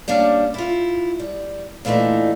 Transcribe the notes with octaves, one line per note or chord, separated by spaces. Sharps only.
G3 A#3 C#4 D4
E4 F4
G3
A#2 E3 A3 D4 D#4